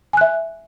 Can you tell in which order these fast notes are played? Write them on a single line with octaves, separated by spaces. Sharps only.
G#5 F#6 E5